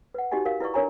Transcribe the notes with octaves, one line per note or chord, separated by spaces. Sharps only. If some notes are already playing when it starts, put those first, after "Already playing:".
B4 F#5
D#4 F#4 G4 D#5 G#5
A#4 F5
E4 B4 D5 E5 C#6
D4 A#4 C#5 G#5 A#5